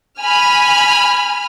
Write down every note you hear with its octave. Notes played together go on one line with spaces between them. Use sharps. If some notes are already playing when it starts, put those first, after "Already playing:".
G#5 B5 F6